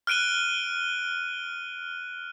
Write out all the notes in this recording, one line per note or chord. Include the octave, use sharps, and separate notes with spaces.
F6 F#6 D7 D#7 G7